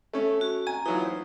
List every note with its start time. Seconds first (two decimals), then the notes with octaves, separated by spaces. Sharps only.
0.13 A3 C#4
0.41 F#4
0.67 G#5 A#5
0.86 E3 F#3 D#4 F4
1.05 C5